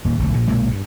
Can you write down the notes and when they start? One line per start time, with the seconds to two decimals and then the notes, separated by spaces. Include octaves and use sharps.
0.05 D#1 A#2
0.19 D#1 B1 D3 A3
0.33 A#1 A#2
0.47 B1 A#2 G#3 A#3
0.71 G2